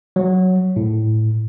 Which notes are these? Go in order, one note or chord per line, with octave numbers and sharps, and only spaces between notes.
F#3
A2